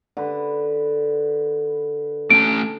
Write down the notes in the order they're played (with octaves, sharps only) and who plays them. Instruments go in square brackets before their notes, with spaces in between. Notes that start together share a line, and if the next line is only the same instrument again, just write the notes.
[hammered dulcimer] D3 B4
[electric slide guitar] A3 C#4 A5 [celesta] D7